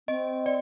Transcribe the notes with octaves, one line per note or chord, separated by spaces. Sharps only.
C4 D#5
D5